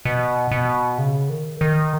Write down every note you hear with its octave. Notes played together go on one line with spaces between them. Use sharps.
B2
B2
C#3
D#3
D#3